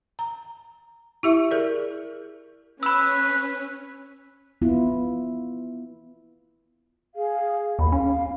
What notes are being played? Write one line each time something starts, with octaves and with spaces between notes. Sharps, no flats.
A#5
E4 G4 E5 C#6
G#4 A#4 D5
C#4 B4 B5 E6
B3 E4 F4
G#4 F5
D#2 B5
C#4 F5